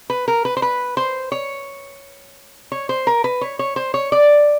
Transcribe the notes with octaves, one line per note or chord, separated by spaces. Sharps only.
B4
A#4
B4
C5
B4
C5
C#5
C#5
C5
A#4
B4
C#5
C#5
C5
C#5
D5